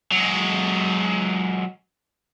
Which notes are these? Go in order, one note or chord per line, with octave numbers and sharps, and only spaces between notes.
F#3 G#3